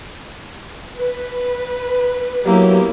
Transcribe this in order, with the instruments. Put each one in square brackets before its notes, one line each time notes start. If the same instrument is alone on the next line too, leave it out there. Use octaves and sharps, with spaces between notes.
[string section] B4
[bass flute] F#3 [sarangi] A#3 [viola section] B3 E4 G4